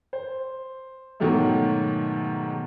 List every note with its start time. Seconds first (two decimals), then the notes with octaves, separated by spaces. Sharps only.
0.13 C5
1.20 G#2 B2 D#3 F#3 G#3 A3